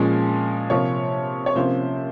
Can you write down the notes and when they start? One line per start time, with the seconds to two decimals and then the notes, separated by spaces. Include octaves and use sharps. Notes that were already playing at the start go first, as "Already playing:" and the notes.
Already playing: A#2 F3 G#3 C#4
0.70 C3 F3 A#3 C#5
1.46 C#5
1.55 C3 F3 A#3 C#4 C5